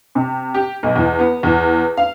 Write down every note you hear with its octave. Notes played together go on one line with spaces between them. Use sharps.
C3
G4
B1
E2
B3
E2
F5